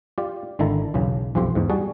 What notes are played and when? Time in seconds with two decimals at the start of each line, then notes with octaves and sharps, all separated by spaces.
0.18 F4 G4 D5
0.59 G#1 D3 D#3 E4 A5 A#5
0.94 B1 E2 C#3
1.35 B1 F2 F3 G4 C5
1.55 E2 G#2
1.70 G3 F#4 G#4 A5